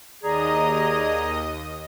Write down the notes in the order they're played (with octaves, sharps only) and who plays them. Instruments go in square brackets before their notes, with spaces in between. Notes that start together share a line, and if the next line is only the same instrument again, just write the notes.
[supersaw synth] D#2 D#5 D#6 [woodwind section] G#4 D5 A#5